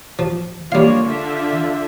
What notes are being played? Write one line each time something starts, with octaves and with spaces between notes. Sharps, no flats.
F3
G3 A#3 D4 F4 C#5 F5
D3 D4 E5